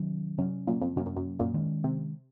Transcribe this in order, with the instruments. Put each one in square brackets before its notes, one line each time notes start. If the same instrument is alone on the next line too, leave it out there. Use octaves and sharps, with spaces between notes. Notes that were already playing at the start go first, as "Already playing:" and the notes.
Already playing: [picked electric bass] C3 D#3 F#3 C#4
[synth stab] F#2 [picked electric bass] C3 F#3 C#4
[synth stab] F#2 A#2
F2
[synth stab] F#2 [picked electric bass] C3 F#3 A#3 C#4
[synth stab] F#2
F#2
F#2 A#2
[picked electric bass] D#3 G#3 C#4
[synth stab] C3